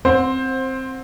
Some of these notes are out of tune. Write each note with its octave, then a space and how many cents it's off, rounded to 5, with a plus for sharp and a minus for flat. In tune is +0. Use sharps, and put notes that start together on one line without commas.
C4 +0 C5 +15 F#5 -20